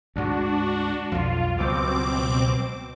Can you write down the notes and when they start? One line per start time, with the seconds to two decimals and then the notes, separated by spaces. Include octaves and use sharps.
0.16 D2 G#2 G#3 D4 F#4
1.12 B1 F2 F4
1.58 C#2 B2 F#3 G3 C4 D6